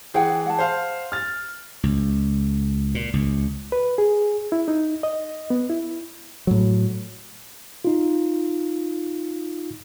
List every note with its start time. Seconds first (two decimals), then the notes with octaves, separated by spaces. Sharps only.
0.14 E3 G#4 C5 F#5 G5
0.46 F#5 A5
0.59 C5 F5
1.12 F6 A6
1.83 C#2
2.95 A#2
3.14 C#2
3.72 B4
3.98 G#4
4.52 E4
4.68 D#4
5.03 D#5
5.50 B3
5.69 E4
6.47 A2 F#3
7.85 D#4 F4